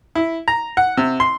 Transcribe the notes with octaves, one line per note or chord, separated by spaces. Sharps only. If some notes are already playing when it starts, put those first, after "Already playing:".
E4
A#5
F#5
C3
C6